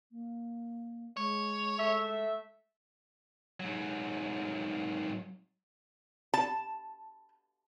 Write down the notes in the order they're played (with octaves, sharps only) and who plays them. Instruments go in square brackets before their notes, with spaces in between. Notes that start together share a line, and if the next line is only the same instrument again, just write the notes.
[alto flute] A#3
[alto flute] G#3 [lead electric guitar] C#5
[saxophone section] A3 E5
[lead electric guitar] G#2 F#3
[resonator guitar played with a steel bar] A5